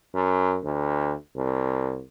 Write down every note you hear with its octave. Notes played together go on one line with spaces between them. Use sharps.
F#2
D2
C2